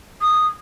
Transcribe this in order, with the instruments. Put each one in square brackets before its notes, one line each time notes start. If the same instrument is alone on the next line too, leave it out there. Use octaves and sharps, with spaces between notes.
[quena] D#6